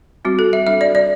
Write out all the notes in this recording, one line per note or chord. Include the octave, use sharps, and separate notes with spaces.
G3 C4 F#4
A4
E5
G3 D4 E5
D5
D5